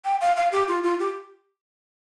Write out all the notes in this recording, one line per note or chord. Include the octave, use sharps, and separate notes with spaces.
G5
F5
F5
G4
F4
F4
G4